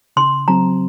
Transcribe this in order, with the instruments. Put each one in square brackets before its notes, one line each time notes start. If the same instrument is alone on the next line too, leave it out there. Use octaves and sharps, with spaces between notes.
[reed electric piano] C#3 [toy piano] C6
[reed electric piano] F#3 C4 [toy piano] A#5